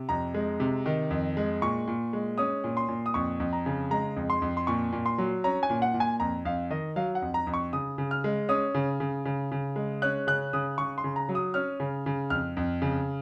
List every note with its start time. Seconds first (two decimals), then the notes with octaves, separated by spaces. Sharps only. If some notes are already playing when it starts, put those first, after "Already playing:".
Already playing: C3
0.09 F2 A#5
0.34 G#3
0.60 C3
0.86 D#3
1.10 F2
1.37 G#3
1.62 A#2 C#6
1.87 A#2
2.13 G#3
2.38 C#4 D#6
2.64 A#2
2.77 C6
2.88 A#2
3.06 D#6
3.14 F2 C#6
3.40 F2
3.53 A#5
3.66 C#3
3.91 G#3 A#5
4.16 F2
4.30 C6
4.42 F2
4.57 C6
4.67 A#2 C#6
4.92 A#2
5.06 C6
5.18 F#3
5.44 C#4 A#5
5.63 G#5
5.69 A#2
5.82 F#5
5.94 A#2
6.00 G#5
6.20 F2 A#5
6.45 F2 F5
6.70 D#3 D#5
6.96 F#3 F5
7.15 F#5
7.22 F2
7.34 A#5
7.47 F2
7.54 C#6
7.73 C#3 D#6
7.98 C#3
8.11 F6
8.24 G#3
8.49 C#4 D#6
8.74 C#3
9.00 C#3
9.25 C#3
9.52 C#3
9.76 G#3
10.02 C#4 F#6
10.27 C#3 F#6
10.53 C#3 D#6
10.78 C#3 C#6
10.98 C6
11.04 C#3
11.16 A#5
11.29 F#3
11.35 D#6
11.54 C#4 F6
11.80 C#3
12.06 C#3
12.30 F2 F6
12.57 F2
12.82 C#3